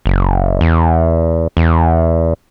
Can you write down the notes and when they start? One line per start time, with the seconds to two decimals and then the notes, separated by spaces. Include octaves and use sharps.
0.06 F#1
0.61 E2
1.57 E2